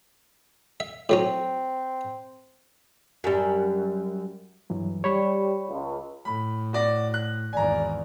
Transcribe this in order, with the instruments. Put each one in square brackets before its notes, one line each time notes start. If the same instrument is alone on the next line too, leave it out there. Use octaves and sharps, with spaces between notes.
[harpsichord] E5
[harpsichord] A2 F#3 C#4 [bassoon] C4
[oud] F#2 G3
[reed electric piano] G2 E3 F#3
[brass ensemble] G3 [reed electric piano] C#5 B5 C#6
[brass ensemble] C#2
[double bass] A2 [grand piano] B5
[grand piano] F#4 D5 A#6
F#6
[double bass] G#1 E2 [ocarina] D5 [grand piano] G#5 A#5